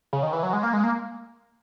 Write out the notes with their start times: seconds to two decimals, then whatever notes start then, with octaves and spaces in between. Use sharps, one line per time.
0.13 C#3
0.23 D#3
0.33 E3
0.43 F#3
0.53 G#3
0.63 A#3
0.73 G#3
0.84 A#3